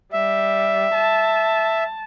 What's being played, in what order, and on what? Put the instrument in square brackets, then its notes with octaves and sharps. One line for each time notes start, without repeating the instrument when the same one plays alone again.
[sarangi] G3 [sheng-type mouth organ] E5
[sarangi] A5